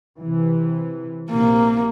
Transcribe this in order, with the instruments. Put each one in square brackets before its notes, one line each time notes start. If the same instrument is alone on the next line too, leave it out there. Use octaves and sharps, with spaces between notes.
[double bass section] C3 E3
[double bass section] A#1 C3 [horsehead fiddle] A#3